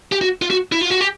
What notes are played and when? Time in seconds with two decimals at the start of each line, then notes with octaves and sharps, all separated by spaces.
0.12 G4
0.21 F#4
0.42 F4
0.50 F#4
0.72 E4
0.81 F4
0.90 F#4
1.01 G4